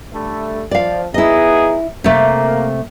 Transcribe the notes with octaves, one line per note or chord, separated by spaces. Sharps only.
D3 G3 A3
F3 D5 F5
B3 D#4 E4 G#4 D#5
C3 A3 A#3